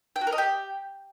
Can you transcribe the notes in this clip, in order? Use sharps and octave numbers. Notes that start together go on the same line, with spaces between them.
G5
F#4
A#4
D#5
G4